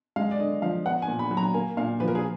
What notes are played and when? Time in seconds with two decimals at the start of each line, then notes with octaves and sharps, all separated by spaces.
0.16 G#3 F5
0.31 D5
0.40 D3 D#5
0.62 F3 F5
0.85 B3 F#5
1.02 G#5
1.08 A#2
1.19 B5
1.31 F#3
1.37 A#5
1.54 A#3 G#5
1.77 A#2 F5
2.00 F3 B4
2.08 A#4
2.15 G#4